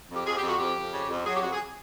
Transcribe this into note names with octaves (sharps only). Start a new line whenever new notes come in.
F2
G4
F2 G#4
G4
F2
F#4
F2 G4
F2
C#3
F2
F#3 G#4
G4
F2 F#4
G#4